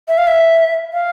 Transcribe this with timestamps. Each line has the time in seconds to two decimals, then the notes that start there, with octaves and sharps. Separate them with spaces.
0.08 E5
0.18 F5
0.27 E5
0.93 F5